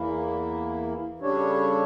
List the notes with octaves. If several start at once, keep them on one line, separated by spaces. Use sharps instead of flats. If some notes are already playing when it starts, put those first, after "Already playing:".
Already playing: E2 E3 A#3 E4
C#3 G3 D4 A4 C#5